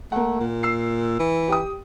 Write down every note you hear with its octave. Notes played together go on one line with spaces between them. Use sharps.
A3 A#3 F#5
A#2
E6 C7
E3
G4 G5 D#6